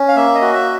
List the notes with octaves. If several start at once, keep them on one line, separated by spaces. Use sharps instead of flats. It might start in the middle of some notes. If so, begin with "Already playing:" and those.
Already playing: C#4
F5
A#3 E5
D#5
F#4
E5